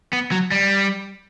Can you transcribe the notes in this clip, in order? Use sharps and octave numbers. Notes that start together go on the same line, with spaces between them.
B3
F#3
G3